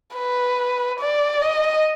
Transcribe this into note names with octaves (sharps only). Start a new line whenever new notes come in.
B4
D5
D#5